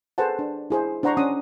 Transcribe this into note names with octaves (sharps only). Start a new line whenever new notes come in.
G#4 A4 B4 C5 F#5 A5
D4
E4 G#4 C5
D4 C5 F#5 A#5 C6 C#6
C#4 F#5 D#6